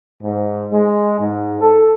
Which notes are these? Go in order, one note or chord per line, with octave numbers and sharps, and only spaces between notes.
G#2
G#3
G#2
A4